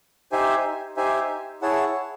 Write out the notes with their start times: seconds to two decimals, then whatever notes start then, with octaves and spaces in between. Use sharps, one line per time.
0.32 D#4 G4 C5 E5 G#5
0.97 D#4 G4 C5 E5 G#5
1.62 E4 G#4 C#5 F#5 A5